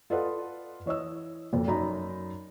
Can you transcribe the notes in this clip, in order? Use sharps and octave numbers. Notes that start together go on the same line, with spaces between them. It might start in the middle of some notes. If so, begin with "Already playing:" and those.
F4 A4 B4 D5 D#5 F#5
E3 C#5 D#5 E6
F#1 F2
F#2 D#4 D5 A#5 B5